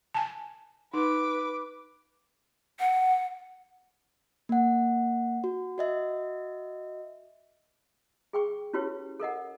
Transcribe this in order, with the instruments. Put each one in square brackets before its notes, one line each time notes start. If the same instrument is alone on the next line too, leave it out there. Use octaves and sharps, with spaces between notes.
[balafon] G#5 A5
[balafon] D#4 [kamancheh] B4 D6
[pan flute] F#5
[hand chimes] A#3 F#5
F#4
F#4 D#5 E5
[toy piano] G#4 G5 C#6
C#4 E4 F#4 G4 B4 C#5
A4 A#4 D#5 F#5